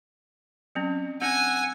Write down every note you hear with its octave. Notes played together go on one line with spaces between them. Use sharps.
F#3 C4 C#4
C4 D4 F#5 G#5 E6